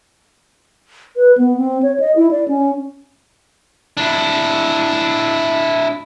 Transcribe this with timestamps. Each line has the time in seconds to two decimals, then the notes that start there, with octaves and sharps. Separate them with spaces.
1.16 B4
1.38 B3
1.57 C4
1.83 C#5
2.00 D#5
2.16 E4
2.31 D5
2.48 C#4
3.97 D4 E4